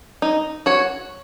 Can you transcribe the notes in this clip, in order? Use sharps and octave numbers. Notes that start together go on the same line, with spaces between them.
D#4
F#4 C#5